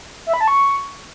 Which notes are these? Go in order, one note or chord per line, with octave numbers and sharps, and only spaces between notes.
E5
B5
A5
C#6